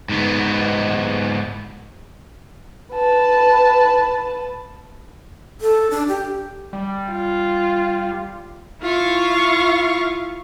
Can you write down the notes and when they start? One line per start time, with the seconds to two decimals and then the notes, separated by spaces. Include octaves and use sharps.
0.09 G#2 B3
2.93 B4 A5
5.61 A4
5.90 D4
6.08 G4
6.73 G3
7.12 F4
8.81 E4 F4 F5 C#6